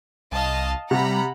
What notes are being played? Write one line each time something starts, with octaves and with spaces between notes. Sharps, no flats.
C2 D#5 F5 A5
C3 G3 F#5 A#5 B5